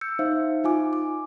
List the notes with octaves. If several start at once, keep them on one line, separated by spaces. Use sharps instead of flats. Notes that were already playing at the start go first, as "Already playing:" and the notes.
E6 G6 C#7
D#4 C5 E5 F5
D#4 F4 G#5 D6
D6